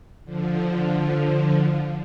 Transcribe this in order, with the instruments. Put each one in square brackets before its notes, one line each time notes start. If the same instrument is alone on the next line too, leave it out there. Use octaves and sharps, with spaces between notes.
[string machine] D3 F3